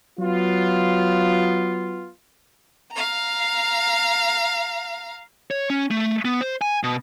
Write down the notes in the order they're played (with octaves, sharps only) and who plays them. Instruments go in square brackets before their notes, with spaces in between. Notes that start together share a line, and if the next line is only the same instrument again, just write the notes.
[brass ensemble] F#3 B3 F4
[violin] F5 A#5
[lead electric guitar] C#5
C#4
A3
B3
C5
G#5
B2